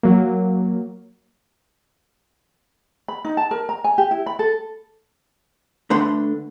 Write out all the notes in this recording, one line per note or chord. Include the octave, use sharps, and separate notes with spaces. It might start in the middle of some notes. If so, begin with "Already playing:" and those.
F#3 A#3
B5
D#4
A5
A#4
A#5
G#5
G4
E4
B5
A4
D3 A3 B4 C6